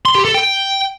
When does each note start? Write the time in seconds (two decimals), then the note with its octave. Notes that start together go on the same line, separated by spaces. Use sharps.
0.05 C6
0.15 G4
0.25 A4
0.34 G5